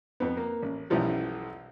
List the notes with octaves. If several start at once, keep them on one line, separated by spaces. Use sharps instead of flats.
F2 B3
A#3
A1
B1 F#2 E3 F3 G3